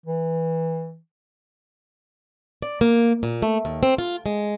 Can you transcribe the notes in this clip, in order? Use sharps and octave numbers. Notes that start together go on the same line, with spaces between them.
E3
D5
A#3
A#2
A3
D#2
C4
F4
G#3